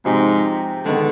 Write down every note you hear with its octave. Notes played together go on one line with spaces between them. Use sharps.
G#2 C3 F3 C4 D#4 G4
G#2 D3 D#3 B3